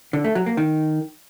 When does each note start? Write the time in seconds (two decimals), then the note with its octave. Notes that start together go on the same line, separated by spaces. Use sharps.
0.13 D3
0.24 A3
0.35 F#3
0.46 A#3
0.57 D#3